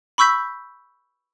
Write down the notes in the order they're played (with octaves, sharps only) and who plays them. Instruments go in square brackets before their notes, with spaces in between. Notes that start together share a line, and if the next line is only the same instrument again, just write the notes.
[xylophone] B5 C#6 E6 G6 B6